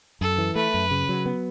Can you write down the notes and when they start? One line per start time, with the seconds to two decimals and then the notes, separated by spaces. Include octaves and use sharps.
0.21 F#2 A4
0.38 E3
0.56 A3 B4
0.74 F#2
0.91 C#3
1.09 F#3
1.26 B3